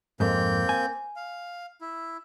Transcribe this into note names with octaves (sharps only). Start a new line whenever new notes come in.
F2 G#2 A#3 C4 G6
G#5
F5
E4